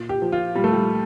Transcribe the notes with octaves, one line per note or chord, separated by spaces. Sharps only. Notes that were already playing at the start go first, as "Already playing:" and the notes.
Already playing: A#2
G4
F3
F4
A#2 G3
A3
G3